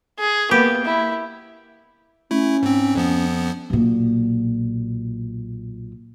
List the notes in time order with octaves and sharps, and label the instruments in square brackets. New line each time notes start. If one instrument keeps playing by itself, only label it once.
[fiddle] G#4
[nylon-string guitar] A#3 [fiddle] B3 [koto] G4
[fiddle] E4
[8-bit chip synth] A3 E4 [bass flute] C#4
[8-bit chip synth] G#2 C4
F2 F3 B3
[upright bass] B1 A#2